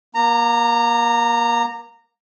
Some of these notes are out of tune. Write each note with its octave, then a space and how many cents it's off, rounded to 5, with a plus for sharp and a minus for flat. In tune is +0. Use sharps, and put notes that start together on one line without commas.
A#3 +30 A#5 -15